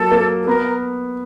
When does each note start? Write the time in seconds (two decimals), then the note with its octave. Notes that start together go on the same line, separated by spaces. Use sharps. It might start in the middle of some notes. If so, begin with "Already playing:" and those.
Already playing: F#3 A#3 A4
0.12 A#3
0.42 A4
0.47 B3 A#4